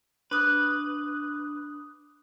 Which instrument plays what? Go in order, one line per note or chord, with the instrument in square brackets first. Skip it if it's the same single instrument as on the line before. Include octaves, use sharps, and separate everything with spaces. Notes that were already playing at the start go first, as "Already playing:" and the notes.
[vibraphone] D4 D#6 [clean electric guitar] B4